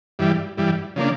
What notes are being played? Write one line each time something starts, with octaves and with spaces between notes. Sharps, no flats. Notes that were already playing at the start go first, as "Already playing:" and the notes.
G2 E3 G3
G2 E3 G3
C#3 F3 A#3 D4